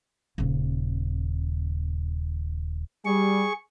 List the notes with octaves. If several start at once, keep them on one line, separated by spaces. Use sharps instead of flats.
D#1 C#3
G3 G#4 C#6